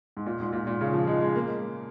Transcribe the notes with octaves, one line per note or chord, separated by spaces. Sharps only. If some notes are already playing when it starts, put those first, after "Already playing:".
G#2
A#2
G#2
A#2
A#2
C#3
F3
G#3
G#3
A#3